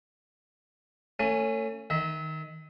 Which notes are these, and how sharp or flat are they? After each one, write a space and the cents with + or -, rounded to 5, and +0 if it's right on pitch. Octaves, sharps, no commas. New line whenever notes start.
A3 +35 C#4 +0
D#3 +0 E5 -30